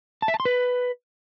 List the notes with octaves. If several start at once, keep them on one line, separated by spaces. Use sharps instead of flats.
A5
E5
A5
C6
B4